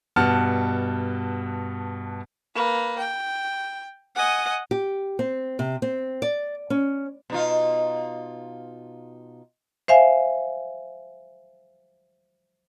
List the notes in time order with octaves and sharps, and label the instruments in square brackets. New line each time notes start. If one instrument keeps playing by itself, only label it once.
[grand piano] G2 B2 F#5 A5 F6
[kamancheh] A#3 B4
G5
[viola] D#5 F#5 [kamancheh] G#5
[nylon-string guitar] G4
C4
C3
C4
D5
C#4
[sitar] B2 D#4 F4
[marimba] C5 E5 F5 G#5